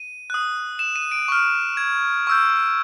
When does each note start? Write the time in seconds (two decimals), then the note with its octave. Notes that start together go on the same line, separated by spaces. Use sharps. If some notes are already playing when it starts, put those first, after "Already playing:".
Already playing: D#7
0.30 D#6 F#6
0.79 E7
0.96 D#7
1.12 D7
1.28 C#6 F6
1.77 G#6
2.27 C#6 E6 G6